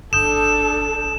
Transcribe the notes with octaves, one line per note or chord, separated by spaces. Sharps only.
G1 D4 A4 D#6 G6 E7